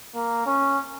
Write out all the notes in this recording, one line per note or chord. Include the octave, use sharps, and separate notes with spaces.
A#3
C#4